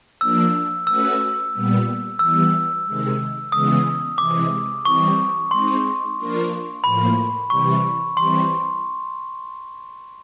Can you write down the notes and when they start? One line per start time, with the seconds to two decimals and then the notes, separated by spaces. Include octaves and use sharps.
0.20 F3 A#3 D4 E6
0.87 A3 C#4 F#4 B4 E6
1.53 A#2 G3 B3
2.19 E3 G3 B3 E6
2.86 C3 D#3 G#3
3.52 C#3 E3 G#3 B3 D#6
4.18 C3 E3 G#3 D6
4.85 E3 G3 C4 C#6
5.51 G#3 C4 D#4 C6
6.17 F3 A#3 D4 F4 A#4
6.84 A2 F3 A#3 B5
7.50 C3 E3 G3 C#6
8.17 E3 G3 C4 C6